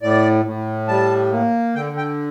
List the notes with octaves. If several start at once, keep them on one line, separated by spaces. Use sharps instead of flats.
A2 D5
A2
G3 A5
A#3
D3 G5
G5